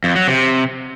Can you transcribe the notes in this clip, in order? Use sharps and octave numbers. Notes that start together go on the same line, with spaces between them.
F2
F#3
C3